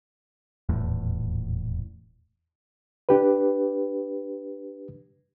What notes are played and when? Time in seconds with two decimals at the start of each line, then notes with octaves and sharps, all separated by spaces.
0.69 D#1 E2 A2
3.09 D4 G4 B4